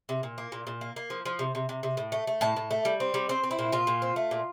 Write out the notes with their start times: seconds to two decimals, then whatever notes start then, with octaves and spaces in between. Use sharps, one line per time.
0.09 C3
0.23 A#2
0.38 A#3
0.52 A#2
0.67 A#2
0.81 A#3
0.96 A#3
1.10 F3
1.26 F3
1.39 C3
1.55 C3
1.69 C3
1.83 C3
1.97 A2
2.12 A3
2.27 A3
2.41 A2 A5
2.56 A2
2.71 A3
2.85 G3
3.00 C4
3.14 G3
3.29 C4 C5
3.44 C4
3.51 E4
3.59 A#2
3.72 A#2 F4
3.87 A#2
4.02 C4
4.16 A3
4.31 A#2